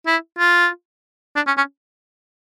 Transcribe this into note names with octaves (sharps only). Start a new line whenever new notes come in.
E4
F4
D4
C#4
C#4